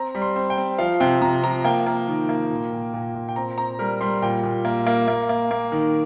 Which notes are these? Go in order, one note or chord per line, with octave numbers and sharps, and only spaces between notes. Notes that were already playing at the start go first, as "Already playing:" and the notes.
Already playing: C4 A#5
G3
C6
C4
G5
C4
F3 F5
C3 G5
C3 A#5
F3 A#5
A#3 G5
A#3
D#3
A#3
A#2
A#2
A#2
A#2
G5
C4 A#5
C4 A#5
G3 A#4
G3 C6
A#2 G5
A#2
A#3
A#3
A#3
A#3
A#3
D#3